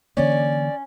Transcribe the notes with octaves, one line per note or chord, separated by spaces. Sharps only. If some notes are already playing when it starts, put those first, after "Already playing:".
D3 E3 A#3 C#4 D5